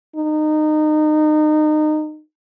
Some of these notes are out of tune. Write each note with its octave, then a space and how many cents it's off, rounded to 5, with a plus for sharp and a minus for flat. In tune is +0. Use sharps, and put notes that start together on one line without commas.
D#4 -25